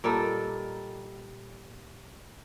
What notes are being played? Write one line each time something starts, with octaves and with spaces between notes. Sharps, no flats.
A#2 G3 D#4 A4